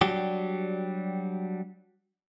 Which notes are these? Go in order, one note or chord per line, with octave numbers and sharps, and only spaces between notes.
F#3 G3 D4 F#4 G4